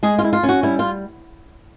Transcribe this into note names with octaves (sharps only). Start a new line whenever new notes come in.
G#3 G#4
F4
E4
F4
C#4
F#4
G3 E4
F4